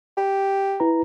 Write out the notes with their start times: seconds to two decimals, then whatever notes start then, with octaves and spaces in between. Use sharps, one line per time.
0.17 G4
0.80 E4 B4 A#5